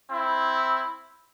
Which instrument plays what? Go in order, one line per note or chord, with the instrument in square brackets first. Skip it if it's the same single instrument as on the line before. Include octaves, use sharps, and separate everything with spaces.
[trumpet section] C4 E4